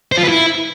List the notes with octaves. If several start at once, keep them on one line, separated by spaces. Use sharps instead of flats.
C5
F4
B4
E4